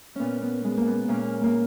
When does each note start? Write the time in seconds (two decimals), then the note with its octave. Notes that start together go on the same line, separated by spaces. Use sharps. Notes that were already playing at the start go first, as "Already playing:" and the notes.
0.15 A#2 B3 C#4
0.42 B3
0.64 G#3 B3
0.77 A#3
0.87 B3
1.08 A#2 A#3 C#4
1.44 A#3